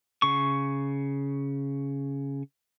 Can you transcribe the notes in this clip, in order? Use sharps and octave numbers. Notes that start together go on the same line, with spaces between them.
C#3 C#6